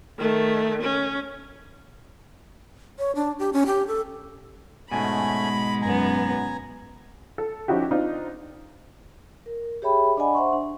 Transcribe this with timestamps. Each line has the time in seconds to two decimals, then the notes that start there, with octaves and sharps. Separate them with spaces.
0.18 D#3 A3
0.83 C#4
2.99 C#5
3.15 D4
3.39 G4
3.53 C#4
3.66 G4
3.87 A4
4.91 G#2 B2 G#3 A3 C#4 G#5 B5
5.82 F#2 B3 G#5 A#5
7.38 A4
7.68 F3 C#4 D#4 E4 F#4 G4
7.91 C4 D4 D#4 F4
9.46 A#4
9.82 G4 G#4 C#5 E5 G5 B5
10.17 D4 D5 D#5 F#5 G#5 B5
10.34 C5 E5 F#5 C6 C#6
10.53 D4